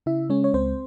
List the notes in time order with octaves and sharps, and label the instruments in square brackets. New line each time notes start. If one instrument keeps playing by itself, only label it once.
[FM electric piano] C#3 E4 E5
G#3 C#4 C#5
C#5
C#2 C4 C5